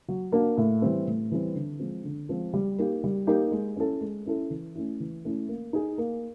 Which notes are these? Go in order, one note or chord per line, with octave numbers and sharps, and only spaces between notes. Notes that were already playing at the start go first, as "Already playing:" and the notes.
F#3
A#3 D4 F#4
A2
E3 G3 C4
A2
E3 G3 C4
D3
F3 G#3 C4
D3
F3 G#3 C4
G3
A#3 D#4 G4
G3
A#3 D#4 G4
G#3
C#4 E4 A4
G#3
C#4 E4 A4
E3
A3 C#4 E4
E3
A3 C#4 E4
A#3
D#4 G#4
A#3